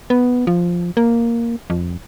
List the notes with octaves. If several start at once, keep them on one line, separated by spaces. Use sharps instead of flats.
B3
F3
A#3
F2